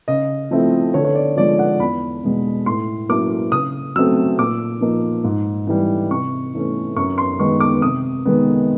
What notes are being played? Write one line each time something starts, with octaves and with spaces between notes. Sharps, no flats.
C#3 D#5
F3 A3 C4 E4
D3 C#5
C#5
D5
F3 G#3 D5
F#5
E2 B5
B2 G#3
A2 C6
F#3 A#3 C#4 E4 D6
C#3 D#6
F#3 A3 C4 E6
A#2 D6
F3 A#3 D#4
G#2
E3 G3
C3 C#6
E3 A3 C#4
F#2 C#6
C6
D#3 G#3 B3 C#6
D6
C3 D#6
D#3 G#3 B3